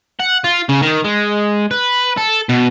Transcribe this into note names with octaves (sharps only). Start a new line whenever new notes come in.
F#5
F4
C#3
D#3
G#3
B4
A4
B2